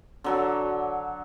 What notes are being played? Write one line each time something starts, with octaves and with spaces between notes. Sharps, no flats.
D3 F#3 A4